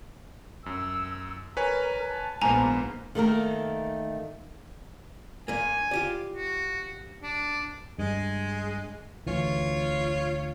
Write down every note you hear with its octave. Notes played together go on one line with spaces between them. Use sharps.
F#2 E6
A#4 B4 C#5 G#5
A5
A#1 G#2 A#3 B3 C5 G#5 A#5
D#3 A3 A#3 A#4
G2 A#3 G#5
F4 G4 D5
F#4
D4
G2 G#3
D2 E3 F4 C#5